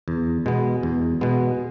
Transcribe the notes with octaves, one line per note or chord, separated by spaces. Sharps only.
E2
B2 G#3 B3
E2
B2 G#3 B3